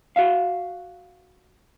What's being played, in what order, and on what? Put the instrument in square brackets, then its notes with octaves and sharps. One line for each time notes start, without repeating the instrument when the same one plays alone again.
[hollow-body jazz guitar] F#4 E5 F5